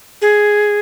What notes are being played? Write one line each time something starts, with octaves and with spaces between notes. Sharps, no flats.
G#4